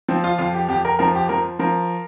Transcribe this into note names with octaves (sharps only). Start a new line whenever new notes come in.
F3 C4
F4
F2 F4
G4
F2 G4
A#4
F3 A#4
G4
F3 A#4
F3 A#4